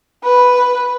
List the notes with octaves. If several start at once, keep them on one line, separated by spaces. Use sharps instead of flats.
B4